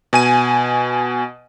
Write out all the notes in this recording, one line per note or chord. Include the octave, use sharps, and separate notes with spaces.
B2 G#5 D#7